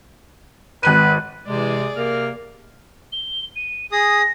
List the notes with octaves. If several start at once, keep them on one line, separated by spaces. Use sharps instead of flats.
G#1 B4 F#6 D#7
C3 E3 G#3 G#4 D5
C3 A#3 A#4 F6
G7
D#7
G#4 D#6 A#6